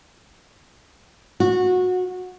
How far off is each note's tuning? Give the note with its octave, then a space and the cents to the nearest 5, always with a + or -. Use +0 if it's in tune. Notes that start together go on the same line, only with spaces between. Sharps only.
F#4 -20